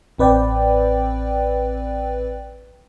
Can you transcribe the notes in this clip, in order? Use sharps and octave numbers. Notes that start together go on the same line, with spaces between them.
A1 C4 B4 D5 G5